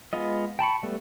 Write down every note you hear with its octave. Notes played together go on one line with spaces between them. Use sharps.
G#3 B3 F4 D#5
G5 A5 B5 C#6
G3 A3 B3